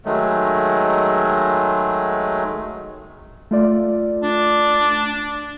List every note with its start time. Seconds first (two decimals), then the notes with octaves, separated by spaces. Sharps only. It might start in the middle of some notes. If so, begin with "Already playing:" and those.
0.05 D#3 F#3 G#3 A3
3.51 A3 F4 D5
4.23 D4